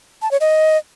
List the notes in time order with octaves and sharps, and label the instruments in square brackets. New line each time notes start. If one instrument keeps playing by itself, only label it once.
[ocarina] A5
C#5
D#5